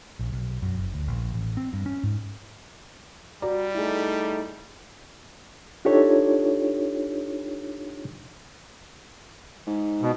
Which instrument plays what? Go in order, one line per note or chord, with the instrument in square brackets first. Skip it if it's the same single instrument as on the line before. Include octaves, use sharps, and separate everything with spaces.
[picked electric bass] A#1
B1
F#2
F#1
D2
A#1
A1
C4
G2
C#4
G#2
[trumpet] G3 [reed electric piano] F#4 A#5 [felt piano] D5
[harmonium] A3 D#4 [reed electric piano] E4 G#4
[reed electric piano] D4 D#4 F4 G4 A4 C#5
[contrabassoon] G#2
[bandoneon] B2